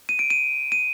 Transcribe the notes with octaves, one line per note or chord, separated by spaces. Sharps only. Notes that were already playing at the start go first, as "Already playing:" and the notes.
D#7
D7
D#7
D#7